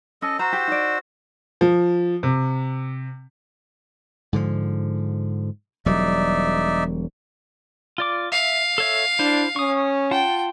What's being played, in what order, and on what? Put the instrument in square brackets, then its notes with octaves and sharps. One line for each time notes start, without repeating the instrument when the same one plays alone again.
[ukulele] C#4 [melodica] A4 D#5
[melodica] F#4 C5 E6 [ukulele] A#5
[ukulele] G4
D#4 D5
[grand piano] F3
C3
[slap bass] G#2 D3 F3
[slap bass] E1 F#3 G3 [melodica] D#4 D5 E5
[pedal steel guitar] F4 D5 D6
[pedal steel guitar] E5 [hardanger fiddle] F5
[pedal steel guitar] A4 C#5 E5
[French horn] D4 [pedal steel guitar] E4 C5
[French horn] C#4 [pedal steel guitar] C#6 D#6
[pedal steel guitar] F4 F#5 A5 [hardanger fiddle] G5